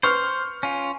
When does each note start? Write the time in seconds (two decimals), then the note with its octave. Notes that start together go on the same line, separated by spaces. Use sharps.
0.03 B4 C5 C#6 F6
0.63 C#4 F4